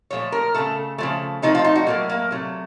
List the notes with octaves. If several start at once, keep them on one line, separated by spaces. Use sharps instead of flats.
A#2 F3 A3 C#5
A#4
C#3 A3 A4
C#3 F3 A3
C3 F3 A3 D#4
F4
D#4
F#4
A2 F#3 A3 A#3
A#3
C3 F#3 A3